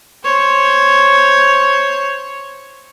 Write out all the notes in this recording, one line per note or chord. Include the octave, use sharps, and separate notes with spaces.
C5 C#5